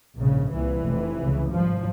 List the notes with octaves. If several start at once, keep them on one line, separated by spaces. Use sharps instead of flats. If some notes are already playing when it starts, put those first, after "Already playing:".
A#1 G#2 C#3
C2 A#2 E3
F1 F2 C3
C#2 C#3
G#1 G2 F3